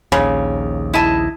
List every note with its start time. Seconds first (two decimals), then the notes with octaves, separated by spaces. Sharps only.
0.12 A#1 D#2 C#3
0.94 E4 D#5 A5